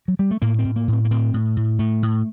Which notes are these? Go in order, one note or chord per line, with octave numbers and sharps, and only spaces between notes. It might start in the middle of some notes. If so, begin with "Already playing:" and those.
F#3
G3
A3
A2 A#3
C4
A2
A#3
A2 C4
A#3
A2 C4
A2
A2
A2 A3
A2